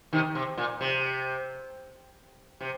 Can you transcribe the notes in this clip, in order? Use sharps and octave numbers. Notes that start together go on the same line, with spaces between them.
C3 D#3
C3
A#2
C3
C3